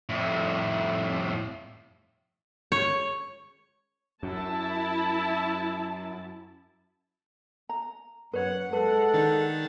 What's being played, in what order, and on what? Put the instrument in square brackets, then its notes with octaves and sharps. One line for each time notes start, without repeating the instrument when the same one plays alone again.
[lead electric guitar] F2 A2
[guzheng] C#5
[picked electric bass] F#2 [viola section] E4 A5
[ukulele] A#5
[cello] F#2 F#5 [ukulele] B4 C#5
[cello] G#3 F#5 [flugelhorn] A4 [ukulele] B4
[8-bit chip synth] D#3 D4 A6